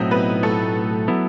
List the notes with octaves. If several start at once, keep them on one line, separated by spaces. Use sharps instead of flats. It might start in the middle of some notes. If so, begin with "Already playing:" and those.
Already playing: B1 A2 F#3 C4 D#4 E4 D#5
B3 B4
A3 A4
F#3 B3 E4